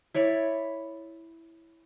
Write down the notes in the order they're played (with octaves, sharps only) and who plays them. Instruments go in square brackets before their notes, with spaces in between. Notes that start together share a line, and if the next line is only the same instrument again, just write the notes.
[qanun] E4 C#5 D5